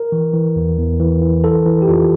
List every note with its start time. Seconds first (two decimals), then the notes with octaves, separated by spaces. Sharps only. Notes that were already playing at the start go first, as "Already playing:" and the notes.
Already playing: A#4
0.12 E3
0.34 E3
0.56 E2
0.78 E2
1.00 E3
1.22 E3
1.44 E3 A4
1.66 E3
1.82 G4
1.88 F2 F4